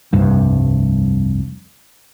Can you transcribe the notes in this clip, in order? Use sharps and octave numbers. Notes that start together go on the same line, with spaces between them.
F1 C2 G2